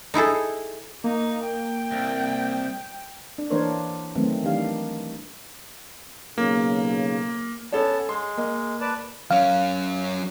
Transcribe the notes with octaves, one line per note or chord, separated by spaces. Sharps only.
D#4 E4 G#4 A4
A#3 D#4
G5
C2
D4
E3 A#3 D4 A#4 C5 C#5
D#3 F#3 A3 B3 C4
D#3 E3 G3 D4 F5
B1 C#3 A#3
B3 C#4 A4 C#5 A5
G#3 C6
A#3 D#5
B4 D5 A5
F#3 C#4 F5